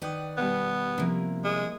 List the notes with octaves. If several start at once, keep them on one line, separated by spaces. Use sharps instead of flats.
D#3 B4 D5 F#5 G5 D#6
B2 G3 B3
C3 F3 A#3 E4 A#4
G#3